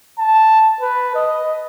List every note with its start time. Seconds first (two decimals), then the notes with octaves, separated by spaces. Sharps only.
0.19 A5
0.80 B4
1.15 D#5